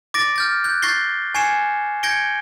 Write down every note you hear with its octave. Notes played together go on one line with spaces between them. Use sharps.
D6 A6 A#6 D7
F6 G6 A6
F#6 G6
C#6 G6 A6 A#6 C7 G7
G#5 C#6 G#6 C7 C#7 E7
G6 G#6 A#6 C#7 D7 G7